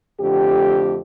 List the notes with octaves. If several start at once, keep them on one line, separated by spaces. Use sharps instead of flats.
F2 D3 A3 G4